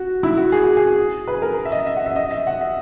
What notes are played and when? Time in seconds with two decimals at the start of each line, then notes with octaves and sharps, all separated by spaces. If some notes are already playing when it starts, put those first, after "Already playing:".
Already playing: F#4
0.23 E4
0.37 F#4
0.52 G#4
0.64 F#4
0.77 G#4
1.28 B4
1.42 A#4
1.65 E5
1.72 D#5
1.87 E5
1.96 F#5
2.06 E5
2.16 D#5
2.31 E5
2.47 F#5
2.61 E5